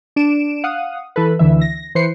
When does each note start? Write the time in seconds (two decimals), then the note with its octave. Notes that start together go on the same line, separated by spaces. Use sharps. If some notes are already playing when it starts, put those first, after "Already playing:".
0.16 D4 D7 E7
0.64 F5 F#5 D#6
1.16 E3 A4 B4
1.39 D2 D3 E3 E5
1.61 A#6
1.95 E3 B4 C5 C7 C#7